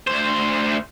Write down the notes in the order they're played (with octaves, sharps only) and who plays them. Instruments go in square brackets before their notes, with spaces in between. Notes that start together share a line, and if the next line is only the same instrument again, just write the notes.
[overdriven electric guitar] D2 C5